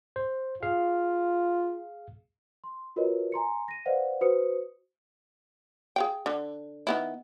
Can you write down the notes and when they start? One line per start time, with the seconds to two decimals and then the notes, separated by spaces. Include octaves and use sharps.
0.16 C5
0.63 F4 G#4 F5
2.64 C6
2.96 F4 F#4 A#4 B4 C#5 D#5
3.32 G#5 A#5 C6 C#7
3.68 A#6 D#7
3.86 B4 C5 D5 D#5 F5 F#5
4.21 F#4 B4 C5 D#6 C#7
5.96 G#4 F5 G5
6.26 D3
6.87 D#3 B3 E4